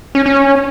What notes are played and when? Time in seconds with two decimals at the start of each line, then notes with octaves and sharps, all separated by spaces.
0.15 C#4
0.26 C#4